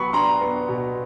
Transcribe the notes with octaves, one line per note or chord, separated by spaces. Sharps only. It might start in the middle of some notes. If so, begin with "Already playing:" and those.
Already playing: F#3 B3 B5 C#6
D4 A#5 C6
B3
B2